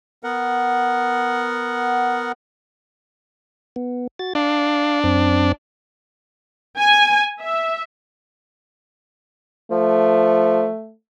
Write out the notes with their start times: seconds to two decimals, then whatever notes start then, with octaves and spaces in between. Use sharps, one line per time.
0.24 B3 A#4 F#5
3.76 B3
4.19 F#4 A6
4.35 D4 F5
5.04 F#2 C4
6.77 G#5
7.40 E5
9.71 F3 A3